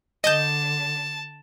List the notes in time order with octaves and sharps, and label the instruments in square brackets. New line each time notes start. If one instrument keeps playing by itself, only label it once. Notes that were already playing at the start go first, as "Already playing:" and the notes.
[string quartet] D3 [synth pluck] D#5 G6 [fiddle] A5